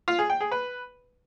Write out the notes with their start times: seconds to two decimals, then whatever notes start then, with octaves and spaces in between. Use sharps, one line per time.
0.08 F4
0.19 G#4
0.30 G5
0.41 G#4
0.51 B4